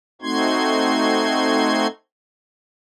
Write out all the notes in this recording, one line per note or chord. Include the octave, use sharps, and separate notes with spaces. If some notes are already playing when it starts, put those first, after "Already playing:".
A3 C4 D#4 F#4 C6 G#6